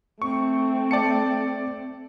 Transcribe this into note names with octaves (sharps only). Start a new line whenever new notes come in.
A3 C4 C#6
D5 A5 C#7